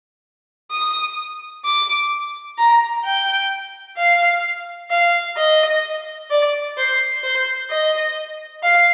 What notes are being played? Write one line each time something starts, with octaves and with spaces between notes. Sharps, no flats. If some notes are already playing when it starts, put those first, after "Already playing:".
D#6
D6
A#5
G5
F5
F5
D#5
D5
C5
C5
D#5
F5